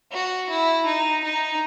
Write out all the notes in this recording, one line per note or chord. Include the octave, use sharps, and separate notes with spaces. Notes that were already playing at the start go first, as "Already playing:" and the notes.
F#4
E4
D#4
D#4